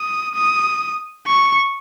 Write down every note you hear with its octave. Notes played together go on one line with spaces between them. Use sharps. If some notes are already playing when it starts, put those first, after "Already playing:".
Already playing: D#6
D#6
C#6